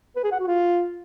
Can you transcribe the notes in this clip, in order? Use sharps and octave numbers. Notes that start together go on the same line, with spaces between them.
B4
G#4
F#5
F#4
F4